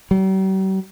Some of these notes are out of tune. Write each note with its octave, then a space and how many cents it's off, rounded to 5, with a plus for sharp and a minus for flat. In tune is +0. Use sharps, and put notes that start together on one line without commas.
G3 -45